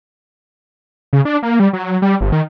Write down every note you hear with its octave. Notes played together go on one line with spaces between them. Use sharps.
C#3
D4
A#3
G3
F#3
G3
G1
D#3